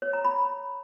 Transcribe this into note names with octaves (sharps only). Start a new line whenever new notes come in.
C#5
A#5
B5